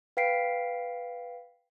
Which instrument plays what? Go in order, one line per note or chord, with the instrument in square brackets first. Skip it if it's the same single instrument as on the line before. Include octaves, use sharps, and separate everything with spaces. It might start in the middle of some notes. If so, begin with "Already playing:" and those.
[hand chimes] B4 F5 G5 B6 C7 D7